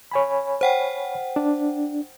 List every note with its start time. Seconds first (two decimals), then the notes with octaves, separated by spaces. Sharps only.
0.11 C#5 G#5 B5
0.61 C5 F#5 G5
1.36 D4